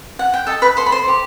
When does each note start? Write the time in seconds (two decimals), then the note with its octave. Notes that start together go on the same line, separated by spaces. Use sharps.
0.19 F#5
0.34 G5
0.47 A4 D#5 A5
0.62 B4 B5
0.77 A4 C5 C6
0.86 B5
0.92 C5 C6
1.08 G4